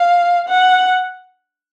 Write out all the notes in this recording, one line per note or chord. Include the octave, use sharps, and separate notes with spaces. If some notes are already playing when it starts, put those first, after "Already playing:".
Already playing: F5
F#5